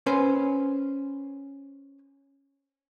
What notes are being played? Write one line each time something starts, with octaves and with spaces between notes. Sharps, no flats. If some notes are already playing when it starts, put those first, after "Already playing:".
C#4 B4 C5